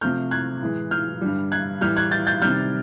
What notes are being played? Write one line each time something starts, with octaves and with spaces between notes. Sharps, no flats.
C3 F3 A3 F6 G6
F#6 G#6
A2 E3 G#3
F6 G6
G2 D3 G3
F#6 G#6
A2 E3 G3 F6 G6
F#6 G#6
G6 A6
G6 A6
C3 D#3 G3 F6 G6